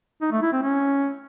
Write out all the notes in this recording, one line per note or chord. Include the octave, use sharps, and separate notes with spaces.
D#4
A3
E4
C4
C#4